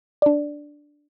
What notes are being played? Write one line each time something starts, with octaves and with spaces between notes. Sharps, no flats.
D4 D5